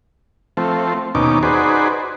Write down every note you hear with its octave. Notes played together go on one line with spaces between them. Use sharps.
F3 A3 C4
D#2 B2 C#4 D#4 D6
D#4 F#4 G#4 B4 C5 D5